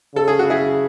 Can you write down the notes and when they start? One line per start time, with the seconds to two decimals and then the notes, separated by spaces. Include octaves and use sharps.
0.15 C#3 A4
0.28 G#4
0.39 F#4
0.50 E4 G#4